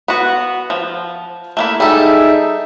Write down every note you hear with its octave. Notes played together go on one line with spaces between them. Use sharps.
B3 F#4
F3
A3 A#3 E4
G3 D#4 G#4 A4 E5